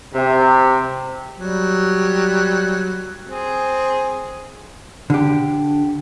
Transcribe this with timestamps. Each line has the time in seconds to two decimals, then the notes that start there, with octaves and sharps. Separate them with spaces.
0.14 C3
1.37 F#3 G3
3.28 C4 G#4
5.10 D3 G4